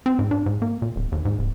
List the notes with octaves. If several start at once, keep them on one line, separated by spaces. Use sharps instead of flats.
C4
G#2
D4
G#2
A#3
A#2
D1
D#2
G#2
D1